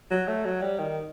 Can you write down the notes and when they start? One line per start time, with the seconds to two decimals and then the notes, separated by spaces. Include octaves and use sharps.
0.11 F#3
0.28 A3
0.45 F#3
0.62 G3
0.79 D#3